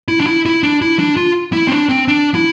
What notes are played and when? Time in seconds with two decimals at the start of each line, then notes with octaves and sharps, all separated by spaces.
0.08 E4
0.20 D4
0.26 E4
0.46 E4
0.63 D4
0.82 E4
0.99 D4
1.17 F4
1.53 E4
1.68 C4
1.71 D4
1.89 C4
2.08 D4
2.35 E4